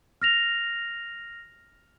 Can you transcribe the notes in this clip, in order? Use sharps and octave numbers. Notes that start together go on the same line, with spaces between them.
F6 A#6 F7